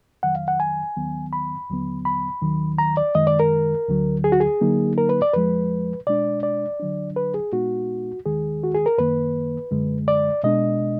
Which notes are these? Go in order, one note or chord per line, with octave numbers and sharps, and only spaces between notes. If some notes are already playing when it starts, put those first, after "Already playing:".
F2 D#3 F#3 F#5
F5
F#5
G#5
D#2 D#3 F#3 B3
B5
D#2 D3 F#3 B3
B5
D#2 D#3 F#3
A#5
D5
F#2 D#3 G#3 D#5
D5
A#4
D2 D3 F#3
G#4
F#4
G#4
D3 F#3 A#3 D#4
A#4
B4
D5
F2 F3 G#3 B4
B2 G#3 D4 D5
D5
D3 F#3 D4
B4
G#4
A#2 G#3 B3 D#4 F#4
D#2 D#3 G#3 G#4
F#4
G#4
A#4
F#2 D#3 A#3 B4
F#2 D3 G#3
D5
B2 G#3 D4 D#5